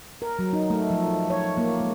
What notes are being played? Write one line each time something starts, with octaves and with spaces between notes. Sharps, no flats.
A#4
F#3
D#4
A3
F3
C#5
A#3
G#3